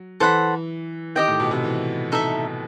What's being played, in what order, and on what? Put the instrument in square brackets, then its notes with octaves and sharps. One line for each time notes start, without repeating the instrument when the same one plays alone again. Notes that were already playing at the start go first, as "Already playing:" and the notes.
Already playing: [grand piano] F#3
[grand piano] E3 [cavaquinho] A4 C5 F#5 B5
[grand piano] D#3 [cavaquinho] G4 D#5 G5
[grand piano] A2
B2
C3
E3
[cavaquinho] D#4 A4 E5